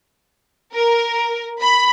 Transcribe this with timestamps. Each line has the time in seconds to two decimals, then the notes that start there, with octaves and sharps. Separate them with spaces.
0.75 A#4
1.61 B5